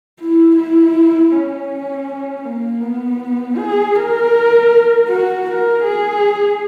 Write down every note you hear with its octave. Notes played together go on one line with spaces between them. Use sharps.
E4
E4
C#4
A#3
B3
G#4
A#4
F#4
A#4
G#4